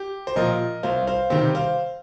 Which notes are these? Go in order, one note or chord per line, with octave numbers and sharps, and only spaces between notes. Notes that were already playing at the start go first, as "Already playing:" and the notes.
Already playing: G4
C5
A#2 F3 A#4 D#5
C2 C5 F5
C5 F5
C3 D#3 G3 G4 C5
C5 F5